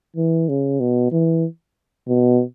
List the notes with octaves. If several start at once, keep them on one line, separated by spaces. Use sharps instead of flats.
E3
C#3
B2
E3
B2